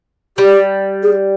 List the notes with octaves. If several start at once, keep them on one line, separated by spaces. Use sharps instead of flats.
G3 G4
G#4